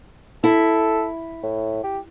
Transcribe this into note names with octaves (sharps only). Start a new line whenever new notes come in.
E4 A4
A2
G4